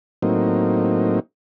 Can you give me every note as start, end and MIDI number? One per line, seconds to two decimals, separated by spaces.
0.22 1.20 45
0.22 1.20 54
0.22 1.20 58
0.22 1.20 60
0.22 1.20 63